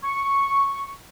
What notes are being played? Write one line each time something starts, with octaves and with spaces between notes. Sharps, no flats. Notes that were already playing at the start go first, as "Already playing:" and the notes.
C#6